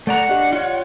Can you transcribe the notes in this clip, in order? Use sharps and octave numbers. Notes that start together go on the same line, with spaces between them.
A3 D5 F#5 A#5
D4 G4 D5 D#5
F4 C#5